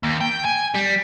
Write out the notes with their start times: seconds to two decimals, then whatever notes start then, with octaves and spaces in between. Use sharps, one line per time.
0.03 D#2
0.21 G5
0.45 G#5
0.75 G3